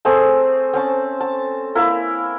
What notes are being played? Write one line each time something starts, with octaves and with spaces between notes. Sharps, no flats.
A3 C4 G#4
C4 C#4 A5
A5
A#3 E4 A#4